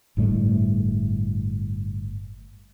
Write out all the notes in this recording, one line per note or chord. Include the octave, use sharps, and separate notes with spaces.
G1 A2 G3 A3